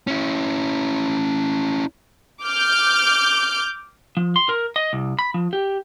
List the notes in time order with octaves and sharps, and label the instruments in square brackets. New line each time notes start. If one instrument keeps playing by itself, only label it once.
[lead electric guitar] C#4 E4
[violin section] D6 F6 G6
[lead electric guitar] F3
C6
A#4
D#5
C2
B5
F3
G4